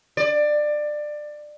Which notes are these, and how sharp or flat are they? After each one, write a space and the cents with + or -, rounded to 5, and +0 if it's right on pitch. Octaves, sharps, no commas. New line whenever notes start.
D5 +20